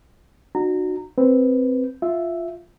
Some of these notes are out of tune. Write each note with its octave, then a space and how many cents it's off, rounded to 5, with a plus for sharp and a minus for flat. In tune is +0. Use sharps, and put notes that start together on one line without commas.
D4 +45 F#4 -15 A#5 -20
C4 +0 B4 +0
F4 +0 E5 +0